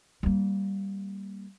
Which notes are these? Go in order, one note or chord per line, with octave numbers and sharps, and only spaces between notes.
G3 A#3